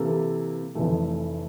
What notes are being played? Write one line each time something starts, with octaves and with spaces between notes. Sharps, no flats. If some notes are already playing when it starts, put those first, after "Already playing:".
Already playing: C3 E3 A#3 E4 A4
F1 F2 E3 A3